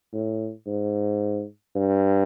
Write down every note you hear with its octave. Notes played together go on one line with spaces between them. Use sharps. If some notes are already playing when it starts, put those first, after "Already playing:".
A2
G#2
G2